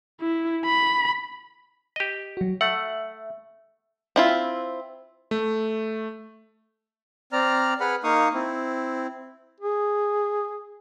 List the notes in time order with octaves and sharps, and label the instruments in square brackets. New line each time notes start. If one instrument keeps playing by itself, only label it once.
[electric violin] E4
B5
[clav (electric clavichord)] G4 D#5
[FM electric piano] F#3 F#4
[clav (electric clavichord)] A3 F#5 [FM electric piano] E5
[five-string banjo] C4 E4 F4
[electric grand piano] A3
[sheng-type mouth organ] C4 D5 A#5 F6
G#4 B4 F#5 B5 F6
A#3 D#4 F5 C#6 D#6
C4 E4
[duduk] G#4